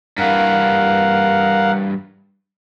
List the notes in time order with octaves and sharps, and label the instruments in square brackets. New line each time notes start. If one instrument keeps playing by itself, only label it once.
[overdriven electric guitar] G2 E3 [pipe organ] A#4 F5 F#5